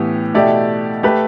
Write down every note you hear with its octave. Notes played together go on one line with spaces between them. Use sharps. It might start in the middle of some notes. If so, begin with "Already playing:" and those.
Already playing: A2 E3 B3 G4
B2 A3 E4 G4 D5
A3 G4 B4